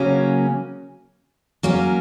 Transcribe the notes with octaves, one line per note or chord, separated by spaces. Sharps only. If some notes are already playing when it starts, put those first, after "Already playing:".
Already playing: C#3 F#3 A#3 C#4
F#3 A#3 C#4